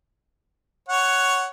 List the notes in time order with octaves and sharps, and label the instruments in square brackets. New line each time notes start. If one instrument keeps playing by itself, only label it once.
[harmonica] C#5 F#5